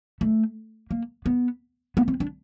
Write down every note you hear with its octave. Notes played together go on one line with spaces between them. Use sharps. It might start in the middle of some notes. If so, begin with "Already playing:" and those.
A3
A#3
B3
B3
C4
D4